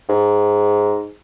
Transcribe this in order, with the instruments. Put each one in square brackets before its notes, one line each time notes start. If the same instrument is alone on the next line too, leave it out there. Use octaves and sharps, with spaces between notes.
[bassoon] G#2